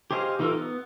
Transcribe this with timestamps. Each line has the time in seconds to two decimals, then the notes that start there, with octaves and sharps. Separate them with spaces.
0.11 G4 G#4 C5 D#5 F5
0.39 E3 D#4 F4 A4 A#4
0.55 B3